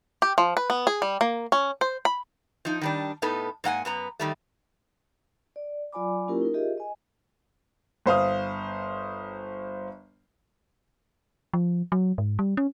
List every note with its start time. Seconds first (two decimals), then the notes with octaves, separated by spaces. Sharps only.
0.22 G4
0.38 F3
0.57 B4
0.70 B3
0.87 G#4
1.02 G3
1.21 A#3
1.52 C#4
1.81 C5
2.05 B5
2.65 F3 D#4
2.81 D#3 G3 D4
3.22 A2 B3 D#4 A4
3.64 G#2 A#3 F#5 G#5
3.85 F#2 B3 A#5
4.20 D#3 G3 A3
5.56 D5
5.93 F#3 F4 D5 G#5 B5 D6
6.28 A#3 C#4 E4 F4 G4 A#4
6.42 D#4 A#4
6.54 F4 G4 G#4 D#5 E5
6.78 D#5 G#5
8.06 G1 C5 F5 D#6
11.53 F3
11.92 F#3
12.18 G#2
12.39 G3
12.57 C#4